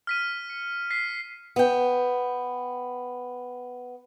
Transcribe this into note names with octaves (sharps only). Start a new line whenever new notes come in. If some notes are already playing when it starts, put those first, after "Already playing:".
F6 B6 D#7
C#7
B6 C7
B3 G5